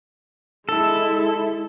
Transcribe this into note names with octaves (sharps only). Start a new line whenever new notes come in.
G#3 E4 A4